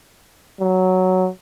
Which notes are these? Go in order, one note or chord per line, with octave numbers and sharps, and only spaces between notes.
F#3